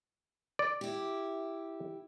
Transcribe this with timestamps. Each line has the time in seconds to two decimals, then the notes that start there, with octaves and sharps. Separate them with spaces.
0.59 D5
0.81 E4 G4